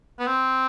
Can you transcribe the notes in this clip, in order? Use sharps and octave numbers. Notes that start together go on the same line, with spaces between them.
B3
C4